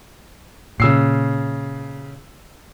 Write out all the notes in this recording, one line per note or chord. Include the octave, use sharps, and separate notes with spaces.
A#2 C#3 E6 C7